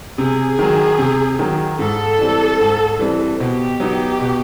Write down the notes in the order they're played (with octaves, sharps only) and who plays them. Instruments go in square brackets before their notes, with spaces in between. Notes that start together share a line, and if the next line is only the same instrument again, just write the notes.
[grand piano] C3 [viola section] G#4
[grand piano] D#3 F#3
C3
D#3 F#3
[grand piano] G#2 [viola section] A4
[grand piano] E3 G3 C4
G#2
E3 G3 C4
[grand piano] B2 [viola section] G4
[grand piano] F#3 B3 D#4
B2